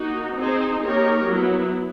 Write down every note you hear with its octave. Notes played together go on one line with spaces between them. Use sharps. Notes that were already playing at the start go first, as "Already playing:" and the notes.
Already playing: A#3 D#4 F#4
C4 D#4 G#4 C5
A#3 D#4 G4 A#4 C#5
F#3 B3 E4